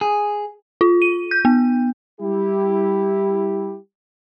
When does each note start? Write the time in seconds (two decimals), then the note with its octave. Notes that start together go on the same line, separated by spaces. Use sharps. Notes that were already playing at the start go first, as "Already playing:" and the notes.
0.01 G#4
0.81 F4
1.02 D#7
1.31 G6
1.45 B3
2.21 G3 E4 G4